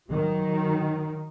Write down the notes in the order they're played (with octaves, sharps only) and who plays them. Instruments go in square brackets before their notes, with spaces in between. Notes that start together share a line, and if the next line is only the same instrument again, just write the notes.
[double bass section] D#3 F#3